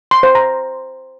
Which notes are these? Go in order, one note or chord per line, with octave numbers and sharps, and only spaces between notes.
C6
C5
A#5